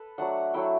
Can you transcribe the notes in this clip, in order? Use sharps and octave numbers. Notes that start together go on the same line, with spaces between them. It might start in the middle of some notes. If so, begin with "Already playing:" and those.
Already playing: A4 B4
F#3 A3 D4 F#5
F#3 A3 E4 G5